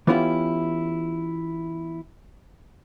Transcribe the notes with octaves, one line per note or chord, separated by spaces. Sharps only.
E3 B3 C#4 E4 F4 G4